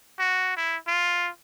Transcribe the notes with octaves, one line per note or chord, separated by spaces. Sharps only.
F#4
E4
F4